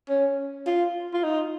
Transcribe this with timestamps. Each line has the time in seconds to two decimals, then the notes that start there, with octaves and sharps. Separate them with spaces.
0.09 C#4
0.67 F4
1.14 F4
1.24 D#4